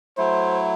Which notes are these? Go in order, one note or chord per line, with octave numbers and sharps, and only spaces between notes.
F#3 A3 E4 C5